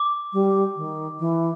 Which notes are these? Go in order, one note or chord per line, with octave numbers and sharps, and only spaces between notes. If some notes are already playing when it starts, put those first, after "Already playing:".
Already playing: D6
G3
D#3
E3